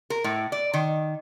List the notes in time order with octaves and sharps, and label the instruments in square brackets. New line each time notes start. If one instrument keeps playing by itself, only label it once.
[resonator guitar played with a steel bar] A#4
A2
D5
D#3